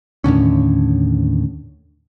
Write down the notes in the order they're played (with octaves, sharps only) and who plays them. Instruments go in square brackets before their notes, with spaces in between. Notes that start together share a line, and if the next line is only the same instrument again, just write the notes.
[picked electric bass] D#2 A2 D3 C#4